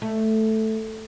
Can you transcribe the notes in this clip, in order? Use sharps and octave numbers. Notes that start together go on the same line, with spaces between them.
A3